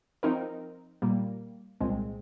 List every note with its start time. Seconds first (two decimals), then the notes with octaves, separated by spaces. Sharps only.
0.23 F3 C4 D#4 A#4
1.02 A#2 G3 A#3
1.81 C2 A#2 G#3 C4